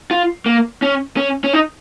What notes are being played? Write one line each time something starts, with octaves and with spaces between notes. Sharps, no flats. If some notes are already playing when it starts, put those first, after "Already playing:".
F4
A#3
C#4
C#4
C#4
D#4